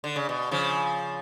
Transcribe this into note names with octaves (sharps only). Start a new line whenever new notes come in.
D3
C#3
B2
C#3 F3